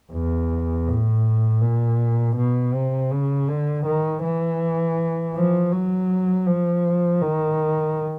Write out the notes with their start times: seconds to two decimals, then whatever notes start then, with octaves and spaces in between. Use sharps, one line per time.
0.12 E2
0.87 A2
1.62 A#2
2.36 B2
2.73 C3
3.11 C#3
3.48 D3
3.86 D#3
4.23 E3
5.35 F3
5.72 F#3
6.47 F3
7.21 D#3